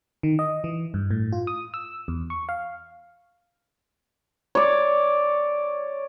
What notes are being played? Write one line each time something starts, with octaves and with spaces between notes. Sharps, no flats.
D#3
D#5
E3
G2
A2
F4
D#6
E6
E2
C#6
F5
C#5 D5